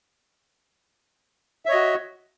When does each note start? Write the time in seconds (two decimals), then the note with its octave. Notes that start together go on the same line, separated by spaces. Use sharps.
1.66 E5
1.68 C#5
1.71 D#5
1.74 F#4